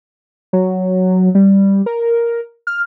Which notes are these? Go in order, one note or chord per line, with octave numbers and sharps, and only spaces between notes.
F#3
G3
A#4
F6